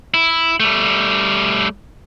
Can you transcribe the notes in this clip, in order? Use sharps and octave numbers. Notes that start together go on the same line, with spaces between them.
E4
G3 A3